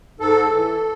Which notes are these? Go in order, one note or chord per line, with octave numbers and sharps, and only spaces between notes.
G#2 A4
E3